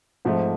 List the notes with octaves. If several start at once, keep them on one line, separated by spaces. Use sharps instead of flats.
G#2 F3 A3 C4